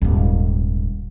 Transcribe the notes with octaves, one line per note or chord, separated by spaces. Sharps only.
D#1 G#1